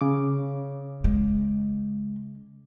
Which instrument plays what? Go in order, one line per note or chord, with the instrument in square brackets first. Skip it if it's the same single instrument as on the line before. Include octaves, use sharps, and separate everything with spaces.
[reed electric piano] C#3 D6
[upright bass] G#3